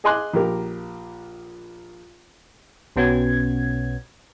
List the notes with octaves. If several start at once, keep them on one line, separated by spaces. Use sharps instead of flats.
G#4 D#5 G#5 C6 D6 F#6
A#1 G4 A#4
B1 B2 B3 C#4 F#4 G#6